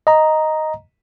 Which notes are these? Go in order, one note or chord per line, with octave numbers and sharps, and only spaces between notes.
D#5 A#5